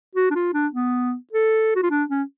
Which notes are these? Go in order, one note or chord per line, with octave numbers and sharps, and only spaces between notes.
F#4
D4
F4
D4
B3
A4
F#4
F4
D4
C#4